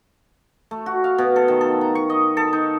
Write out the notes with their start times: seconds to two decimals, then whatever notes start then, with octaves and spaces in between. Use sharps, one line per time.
0.71 A3
0.86 F#4
1.04 F5
1.18 B2
1.36 A4
1.48 D#3
1.61 A4
1.81 A#5
1.95 C#6
2.10 D#5
2.37 A4
2.53 D#4